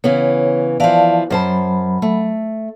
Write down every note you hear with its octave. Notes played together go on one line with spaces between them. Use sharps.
C#3 E3 B3 C#5
E3 F3 D5 F5 A5
F#2 F#3 C5 A5 B5
A3